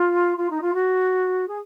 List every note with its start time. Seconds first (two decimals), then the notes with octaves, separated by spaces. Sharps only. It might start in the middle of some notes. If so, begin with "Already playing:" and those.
Already playing: F4
0.37 F4
0.50 D#4
0.61 F4
0.74 F#4
1.48 G#4